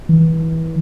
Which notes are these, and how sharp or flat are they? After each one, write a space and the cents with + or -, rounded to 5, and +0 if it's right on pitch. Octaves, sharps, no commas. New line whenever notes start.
E3 -25